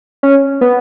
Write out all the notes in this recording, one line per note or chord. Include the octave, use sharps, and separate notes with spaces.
C#4
B3